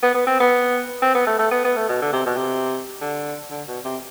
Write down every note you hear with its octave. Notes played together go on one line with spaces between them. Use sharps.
B3
B3
C4
B3
C4
B3
A3
A3
B3
B3
A3
B2
D3
C3
B2
C3
D3
D3
B2
C3